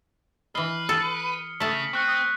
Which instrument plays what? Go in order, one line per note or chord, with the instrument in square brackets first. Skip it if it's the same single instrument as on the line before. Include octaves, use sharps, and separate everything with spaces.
[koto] E3 D#5 [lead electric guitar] B4 [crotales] F6 C7 G7
[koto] A4 [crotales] D#6 C#7
[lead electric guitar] C#3 [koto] A3 A5 [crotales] B6 F#7
[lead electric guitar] C4 [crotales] C#6 F#6 C#7
[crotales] D#6